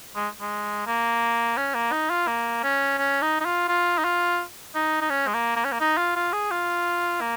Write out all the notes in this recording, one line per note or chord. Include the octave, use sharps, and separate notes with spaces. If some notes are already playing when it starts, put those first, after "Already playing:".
G#3
G#3
A#3
C#4
A#3
D#4
F4
A#3
C#4
C#4
D#4
D#4
F4
F4
D#4
F4
D#4
D#4
C#4
G#3
A#3
A#3
C#4
A#3
D#4
F4
F4
G#4
F4
A#3